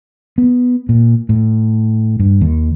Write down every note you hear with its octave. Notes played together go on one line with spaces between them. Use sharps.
B3
A#2
A2
G2
D#2